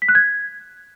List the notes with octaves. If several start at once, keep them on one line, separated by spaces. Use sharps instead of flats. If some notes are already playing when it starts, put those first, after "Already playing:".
B6
F#6
G#6